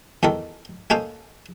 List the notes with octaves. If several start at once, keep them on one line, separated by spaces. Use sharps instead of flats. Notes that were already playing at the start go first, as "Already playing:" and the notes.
E2 D#3 A4 A#4
A#3 C#4 D#4 A4 C5 F5